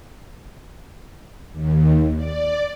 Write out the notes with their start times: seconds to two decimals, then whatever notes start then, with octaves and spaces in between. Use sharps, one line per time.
1.52 D#2
2.16 D5